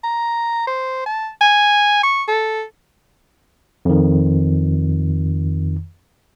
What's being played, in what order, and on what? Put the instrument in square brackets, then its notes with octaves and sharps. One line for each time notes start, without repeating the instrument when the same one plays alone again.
[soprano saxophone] A#5
C5
A5
G#5
C#6
A4
[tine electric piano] F2 D#3